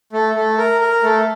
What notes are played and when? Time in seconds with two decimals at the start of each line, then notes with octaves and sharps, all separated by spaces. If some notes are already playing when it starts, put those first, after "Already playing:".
0.13 A3
0.35 A3
0.58 A#4
0.81 A#4
1.03 A3